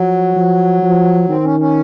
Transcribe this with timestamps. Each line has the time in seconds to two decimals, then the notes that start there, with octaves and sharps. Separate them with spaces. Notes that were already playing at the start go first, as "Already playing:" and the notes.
Already playing: F3 F#3
0.36 F3
0.83 F3
1.29 D#3 C4
1.44 C#4
1.60 C#4